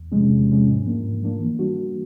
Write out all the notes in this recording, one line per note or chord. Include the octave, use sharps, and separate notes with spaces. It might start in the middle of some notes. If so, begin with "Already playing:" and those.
Already playing: E2
C3 F3 G#3 C#4
E2
C3 F3 G#3 C#4
G#2
F3 A#3 D4
G#2
F3 A#3 D4
E3
G3 A#3 D4 F#4
E3